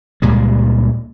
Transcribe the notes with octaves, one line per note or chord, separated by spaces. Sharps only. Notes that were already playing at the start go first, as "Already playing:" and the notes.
C#2 A#2 G3 G#3